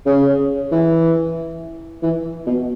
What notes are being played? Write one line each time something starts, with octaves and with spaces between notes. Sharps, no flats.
C#3
E3
E3
B2